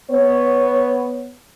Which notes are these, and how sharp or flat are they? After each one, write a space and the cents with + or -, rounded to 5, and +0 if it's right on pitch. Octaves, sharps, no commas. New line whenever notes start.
B3 +0 C#5 +0